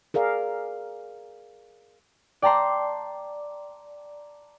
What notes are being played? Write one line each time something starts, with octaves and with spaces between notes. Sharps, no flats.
G#4 A#4 D5 F5
D5 G5 A5 A#5 C6